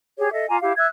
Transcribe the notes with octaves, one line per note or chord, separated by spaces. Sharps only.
G4 G#4 C#5
A4 D#5 E5
F4 G#5 A#5 D6
E4 G4 F5
E5 E6 F#6 G#6